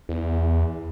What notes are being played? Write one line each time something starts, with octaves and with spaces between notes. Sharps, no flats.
E2